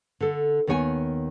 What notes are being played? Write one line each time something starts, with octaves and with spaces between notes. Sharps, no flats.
D3 A4
D#2 D#3 B3 C#5 G5 G#5